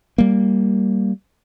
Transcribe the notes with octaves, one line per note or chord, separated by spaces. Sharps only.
G3 A#3